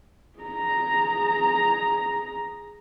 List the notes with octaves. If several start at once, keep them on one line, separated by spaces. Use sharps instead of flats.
G#4 A#5